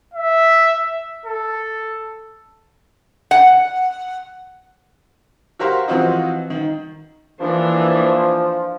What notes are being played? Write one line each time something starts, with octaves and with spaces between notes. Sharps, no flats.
E5
A4
F#5
F#4 G4 A#4 C5 F5
E3 F3 C4 F4 F#4 D#5
D#3
E3 F3 A#3 D4